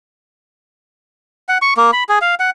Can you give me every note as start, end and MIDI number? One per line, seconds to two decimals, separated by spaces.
1.49 1.58 78
1.62 1.74 85
1.77 1.91 58
1.93 2.04 83
2.09 2.19 68
2.21 2.35 77
2.40 2.50 78